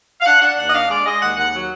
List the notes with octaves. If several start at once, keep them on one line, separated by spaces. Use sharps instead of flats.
F5
D4 F#5
D4 F#5
D#2 F#5
D#5
D4 F5
G#3 D5
G#3 D#5
D#2 F#5
D#2 F#5
F#3